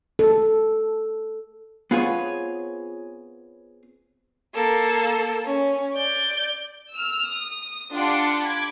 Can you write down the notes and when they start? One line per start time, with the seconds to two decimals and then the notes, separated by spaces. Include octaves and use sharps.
0.19 A4
1.91 B3 C4 F4 G#4 B4 C#5
4.54 A#3 A4
5.45 C#4
5.94 D5 G6
6.93 E6 F6
7.28 D#6
7.93 D4 F4 G4 F#5 C6 D6
8.40 B5 D6 G#6